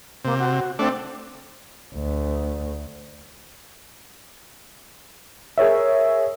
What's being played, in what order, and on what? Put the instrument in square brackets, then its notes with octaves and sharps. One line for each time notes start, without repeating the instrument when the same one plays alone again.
[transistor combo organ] C3 [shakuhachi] A#3
[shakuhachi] F#4
[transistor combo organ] A3 D4 [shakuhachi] C4
[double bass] D2
[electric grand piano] G#4 A#4 C#5 E5